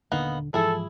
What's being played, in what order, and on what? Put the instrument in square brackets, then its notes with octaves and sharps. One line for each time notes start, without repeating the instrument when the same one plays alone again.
[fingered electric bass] D#1 D3 [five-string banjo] A#3 B3 D#4
[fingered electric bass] G#2 E3 F3 [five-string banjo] E4 G#4 [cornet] A4